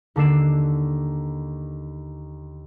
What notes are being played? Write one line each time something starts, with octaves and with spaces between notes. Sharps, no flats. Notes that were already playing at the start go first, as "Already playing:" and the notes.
D#2 D3 D4 E6 C7 E7